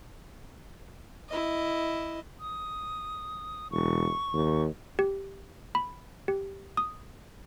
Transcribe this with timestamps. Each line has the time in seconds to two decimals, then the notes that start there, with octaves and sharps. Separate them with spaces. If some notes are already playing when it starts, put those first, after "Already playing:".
1.28 E4 D#5
2.40 D#6
3.71 E1 C#6
4.33 D#2
4.99 G4
5.75 B5
6.28 G4
6.77 D#6